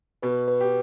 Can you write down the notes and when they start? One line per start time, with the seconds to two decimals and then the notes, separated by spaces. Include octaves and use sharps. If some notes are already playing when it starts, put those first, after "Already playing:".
0.22 B2 B4
0.48 B4
0.61 G4